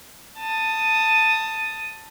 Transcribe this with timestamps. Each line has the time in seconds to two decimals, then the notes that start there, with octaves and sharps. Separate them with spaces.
0.39 A5 D#6